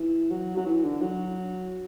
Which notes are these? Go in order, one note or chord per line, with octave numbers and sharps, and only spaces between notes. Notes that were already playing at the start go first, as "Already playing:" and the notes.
Already playing: E3
F#3
F#3
E3
D3
F#3